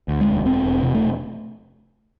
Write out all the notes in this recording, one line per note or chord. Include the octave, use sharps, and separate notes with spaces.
D2
G#3
E1
E2 C4
E1
C3
A3